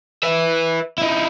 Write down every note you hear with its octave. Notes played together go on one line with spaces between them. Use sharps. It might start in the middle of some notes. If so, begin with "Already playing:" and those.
B4 E5
D#4 E4